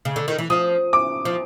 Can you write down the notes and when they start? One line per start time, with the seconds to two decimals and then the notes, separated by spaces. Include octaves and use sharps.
0.05 C#3
0.16 D3
0.28 D#3
0.38 E3
0.50 F3 D#6
0.93 D6
1.25 F3